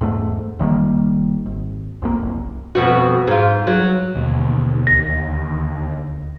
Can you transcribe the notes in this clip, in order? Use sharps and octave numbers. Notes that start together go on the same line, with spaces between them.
E2 G#2 A3
F1 D#3 G3 A#3
G#1
A#1 F2 A#3
F#1 C2
F2 B2 F#4
G#2 F4
F#3
D#2 B2 D3 B3
D2 A#6